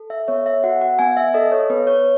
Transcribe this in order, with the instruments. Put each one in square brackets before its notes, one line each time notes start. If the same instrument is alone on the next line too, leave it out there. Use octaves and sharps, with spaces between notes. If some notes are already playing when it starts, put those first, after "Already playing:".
Already playing: [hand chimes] A4
E5
B3 C#5
E5
F#4 F#5
F#5
B3 G#5
E5
A4 D#5
C#5
B3 B4
C#5